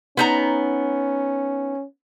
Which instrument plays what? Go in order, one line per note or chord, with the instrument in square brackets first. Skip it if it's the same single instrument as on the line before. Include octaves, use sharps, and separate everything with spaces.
[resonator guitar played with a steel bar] B3 D#4 A#5 [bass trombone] C#4